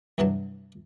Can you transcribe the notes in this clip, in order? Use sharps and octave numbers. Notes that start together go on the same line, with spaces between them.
C2 G2 E3 F#3 A5